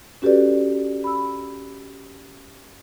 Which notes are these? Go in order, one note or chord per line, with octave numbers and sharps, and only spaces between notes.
C#4 F#4 G4 A4 B4 D5
B5 E6